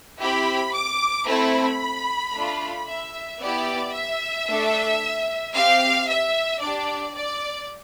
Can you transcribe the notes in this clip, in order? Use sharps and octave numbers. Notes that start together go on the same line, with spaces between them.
C4 E4 G4 B5
D6
A3 C4 E4 B5
A3 D4 F4
E5
B3 E4 G4 D5
E5
A3 D4 A4
C4 G4 F5
E5
D4 G4 D5
D5